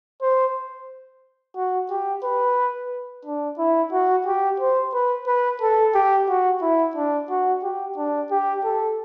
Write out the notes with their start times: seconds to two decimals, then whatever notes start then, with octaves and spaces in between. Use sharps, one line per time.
0.22 C5
1.56 F#4
1.90 G4
2.24 B4
3.26 D4
3.58 E4
3.93 F#4
4.26 G4
4.60 C5
4.94 B4
5.27 B4
5.62 A4
5.95 G4
6.29 F#4
6.62 E4
6.96 D4
7.30 F#4
7.63 G4
7.97 D4
8.31 G4
8.64 A4